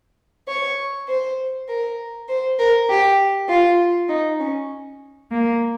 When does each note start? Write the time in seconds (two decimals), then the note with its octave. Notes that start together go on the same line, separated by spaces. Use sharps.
0.48 C#5
1.08 C5
1.68 A#4
2.29 C5
2.59 A#4
2.89 G4
3.48 F4
4.09 D#4
4.39 C#4
5.30 A#3